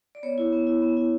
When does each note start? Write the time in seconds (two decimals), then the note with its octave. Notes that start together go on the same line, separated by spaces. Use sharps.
0.15 D5
0.23 B3 C#5
0.38 E4
0.53 B3
0.67 E4
0.82 B3
0.97 E4